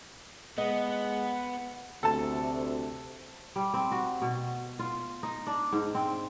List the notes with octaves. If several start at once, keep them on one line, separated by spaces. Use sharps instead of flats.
G#3 B3 D#5 F#5
D2 C3 A4 A5
G3
C4
F#4
B2
F4
D#4
D4
G#2
C4